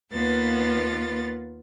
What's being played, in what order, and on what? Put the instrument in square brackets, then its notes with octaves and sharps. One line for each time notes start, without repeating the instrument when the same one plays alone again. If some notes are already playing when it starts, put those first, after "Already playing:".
[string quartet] D#2 A#3 B3 F4 B4 A6